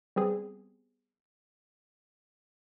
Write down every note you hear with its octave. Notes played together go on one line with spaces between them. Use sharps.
G3 B3 C4 G#4